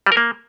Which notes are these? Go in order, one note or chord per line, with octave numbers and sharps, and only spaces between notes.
G3
A#4
A#3